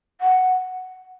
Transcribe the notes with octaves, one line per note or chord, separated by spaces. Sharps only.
F#5